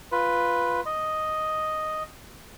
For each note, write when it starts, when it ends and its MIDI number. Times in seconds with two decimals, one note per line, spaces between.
0.12 0.81 65
0.12 0.81 71
0.86 2.03 75